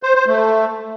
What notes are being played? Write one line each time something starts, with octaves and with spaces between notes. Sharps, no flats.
C5
C5
A3